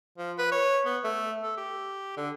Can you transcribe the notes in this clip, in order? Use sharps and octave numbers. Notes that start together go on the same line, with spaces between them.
F3
B4
C#5
B3
A3
A4
G4
D3